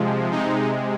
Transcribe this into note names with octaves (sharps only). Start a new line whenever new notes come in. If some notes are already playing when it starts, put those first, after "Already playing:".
Already playing: C3 F3 G#3
C3 G#3 D#4